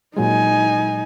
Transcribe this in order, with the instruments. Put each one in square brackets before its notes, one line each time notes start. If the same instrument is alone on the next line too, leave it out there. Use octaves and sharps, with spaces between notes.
[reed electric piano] A#2 F#3 G#3 [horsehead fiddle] D#4 G#5